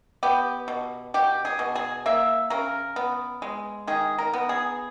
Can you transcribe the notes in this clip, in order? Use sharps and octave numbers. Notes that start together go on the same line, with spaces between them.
B3 G4
B2
B2 G4
G#4
B2
G#4
A#3 E5
C#3 A#4
B3
G#3
D#3 G#4
A#4
B3
G#4